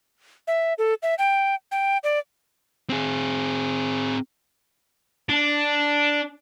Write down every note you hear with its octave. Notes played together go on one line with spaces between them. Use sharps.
E5
A4
E5
G5
G5
D5
C4 G#4
D4